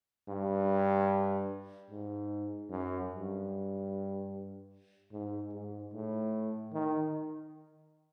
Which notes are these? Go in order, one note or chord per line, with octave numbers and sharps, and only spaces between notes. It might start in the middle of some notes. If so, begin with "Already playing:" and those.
G2
G#2
F#2
G2
G#2
G#2
A2
D#3